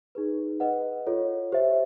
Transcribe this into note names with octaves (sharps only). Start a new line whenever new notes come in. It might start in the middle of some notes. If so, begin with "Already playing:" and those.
D#4 G#4 B4
B4 D#5 F#5
F4 A4 C#5
G4 C5 E5